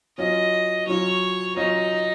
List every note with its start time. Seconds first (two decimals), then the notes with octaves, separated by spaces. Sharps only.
0.17 F#3 C#4 F4 D#5
0.87 F#3 C#4 F4 C#5
1.56 F#3 C#4 D#4 F4